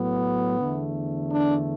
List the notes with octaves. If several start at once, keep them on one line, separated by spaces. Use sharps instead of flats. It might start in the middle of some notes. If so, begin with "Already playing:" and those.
Already playing: A2 F#3 B3
E2 D3 A3
D4